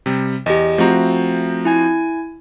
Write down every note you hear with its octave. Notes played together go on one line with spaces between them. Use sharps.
C3 G3
E2 G4 D#5
F3 A3 C4 F#4 A#5
E4 G#5 G#6